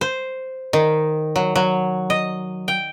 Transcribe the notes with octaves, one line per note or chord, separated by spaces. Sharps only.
C5
D#3
F#3
F#3
D#5
G5